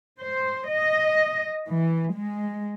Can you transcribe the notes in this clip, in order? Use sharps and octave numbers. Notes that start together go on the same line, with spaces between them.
C5
D#5
E3
G#3